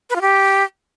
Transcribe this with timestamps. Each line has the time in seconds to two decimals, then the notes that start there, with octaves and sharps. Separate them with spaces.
0.10 B4
0.16 F4
0.21 G4